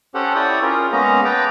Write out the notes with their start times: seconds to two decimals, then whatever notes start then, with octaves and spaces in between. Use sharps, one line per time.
0.15 C#4 G4 A4 C5 F#5
0.36 E4 C#5 D5 G5 D#6
0.62 C#4 F4 G#4 A#4
0.92 G#3 A#3 B3 C#4 D#5 A#5
1.25 B4 G5 A5 A#5 D6